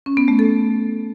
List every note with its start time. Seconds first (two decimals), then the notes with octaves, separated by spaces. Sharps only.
0.06 C#4
0.17 B3
0.28 A3
0.39 A4